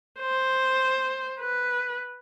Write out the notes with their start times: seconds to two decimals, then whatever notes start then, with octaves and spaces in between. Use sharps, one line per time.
0.20 C5
1.40 B4